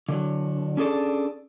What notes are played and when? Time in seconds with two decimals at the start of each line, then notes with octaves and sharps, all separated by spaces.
0.09 D3 F#3
0.77 C#4 D4 G#4 A4 D5